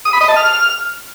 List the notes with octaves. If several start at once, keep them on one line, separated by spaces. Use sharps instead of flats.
D#6
B5
D#5
A5
F6